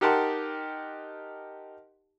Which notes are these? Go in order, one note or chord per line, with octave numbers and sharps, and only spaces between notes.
D#4 G4 A#4 F#5 A5 C6